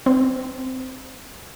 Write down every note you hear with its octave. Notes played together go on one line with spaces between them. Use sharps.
C4